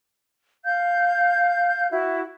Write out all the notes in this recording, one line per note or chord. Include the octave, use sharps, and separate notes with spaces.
F5 G6
E4 F#4